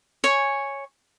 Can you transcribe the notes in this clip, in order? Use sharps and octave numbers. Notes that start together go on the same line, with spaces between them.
C#5 G#5